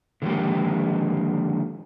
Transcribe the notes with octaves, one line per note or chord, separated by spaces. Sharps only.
D3 D#3 F3 G#3 A#3 G4